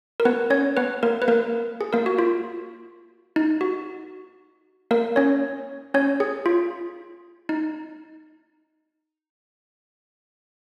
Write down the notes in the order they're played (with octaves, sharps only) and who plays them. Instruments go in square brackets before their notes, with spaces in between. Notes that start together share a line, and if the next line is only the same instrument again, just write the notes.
[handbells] A#4
B3 B4
C#4 C#5
B3 B4
A#3 A#4
B4
A#3 A#4
G#4
A#3 A#4
F#4
F4
D#4
F#4
A#3 A#4
C#4 C#5
C#4 C#5
G#4
F4
D#4